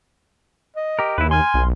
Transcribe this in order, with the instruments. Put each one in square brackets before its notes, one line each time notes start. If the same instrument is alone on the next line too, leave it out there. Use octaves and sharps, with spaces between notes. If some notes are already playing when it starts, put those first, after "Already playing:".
[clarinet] D#5
[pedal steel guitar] G4 A#4
[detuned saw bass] D#2 [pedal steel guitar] E4 B4
[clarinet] G#5 [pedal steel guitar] C6 F6
[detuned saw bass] B1